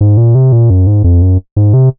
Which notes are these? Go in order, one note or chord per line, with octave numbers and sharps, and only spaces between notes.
G#2
A#2
C3
A#2
F#2
G#2
F2
F#2
G#2
C3